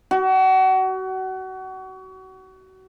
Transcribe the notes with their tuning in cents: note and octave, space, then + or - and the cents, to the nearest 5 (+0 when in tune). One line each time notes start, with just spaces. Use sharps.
F#4 +30